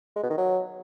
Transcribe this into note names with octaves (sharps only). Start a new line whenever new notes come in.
G#3
B2
D#3
F#3